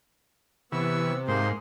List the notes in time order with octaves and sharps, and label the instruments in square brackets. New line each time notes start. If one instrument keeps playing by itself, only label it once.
[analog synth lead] C3 [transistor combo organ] E3 [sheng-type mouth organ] B3 C#6 E6
[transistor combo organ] G#2 [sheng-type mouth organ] A#3 C5 C6